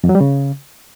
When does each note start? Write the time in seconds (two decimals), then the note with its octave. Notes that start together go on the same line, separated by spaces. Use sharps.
0.04 F2
0.09 F#3
0.15 G3
0.21 C#3